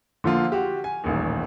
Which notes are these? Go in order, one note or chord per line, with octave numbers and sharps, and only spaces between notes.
D3 F3 A#3 F4
F#4 G4
G#5
D#1 A1 D#2